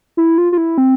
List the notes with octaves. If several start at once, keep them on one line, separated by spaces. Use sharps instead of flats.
E4
F4
F4
E4
C4